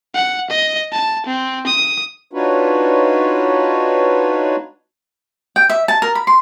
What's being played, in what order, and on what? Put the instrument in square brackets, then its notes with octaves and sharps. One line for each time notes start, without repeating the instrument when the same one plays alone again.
[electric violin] F#5
D#5
A5
C4
D#6
[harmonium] D4 D#4 F4 F#4 B4 C#5
[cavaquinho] G5
E5
A5
A#4
B5
C6